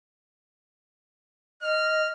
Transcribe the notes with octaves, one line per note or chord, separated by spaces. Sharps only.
D#5 F6